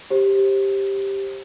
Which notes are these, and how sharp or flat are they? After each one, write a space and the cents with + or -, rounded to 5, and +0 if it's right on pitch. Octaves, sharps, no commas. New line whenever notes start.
G4 +0 C5 +30